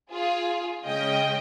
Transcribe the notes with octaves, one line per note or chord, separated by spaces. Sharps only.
F4 G#4
C#3 G#3 C#4 D#5 G5